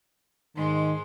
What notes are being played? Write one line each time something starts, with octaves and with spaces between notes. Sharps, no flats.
G#2 D#3 G#3 C6